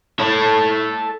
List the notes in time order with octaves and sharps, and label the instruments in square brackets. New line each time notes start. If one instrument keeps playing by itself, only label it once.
[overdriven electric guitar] A4 C#5